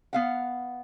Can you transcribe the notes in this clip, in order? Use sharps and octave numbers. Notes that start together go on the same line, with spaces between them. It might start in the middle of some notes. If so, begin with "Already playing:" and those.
B3 F5 F#5